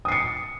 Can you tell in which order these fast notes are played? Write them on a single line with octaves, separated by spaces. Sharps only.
D#6 C7 C#7